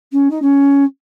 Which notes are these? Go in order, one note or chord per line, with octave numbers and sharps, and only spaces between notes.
C#4
D#4
C#4